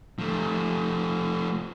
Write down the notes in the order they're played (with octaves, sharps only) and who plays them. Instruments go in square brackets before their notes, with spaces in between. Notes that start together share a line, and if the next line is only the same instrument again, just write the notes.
[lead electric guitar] F3 A3